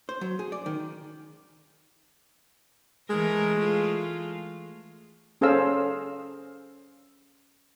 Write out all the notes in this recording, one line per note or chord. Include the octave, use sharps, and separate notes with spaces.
C5
F#3
G#4
D5
D#3
E3 G#3 A3 A#4
A3 F4
C#4 G#4 A4 C5 F5 E6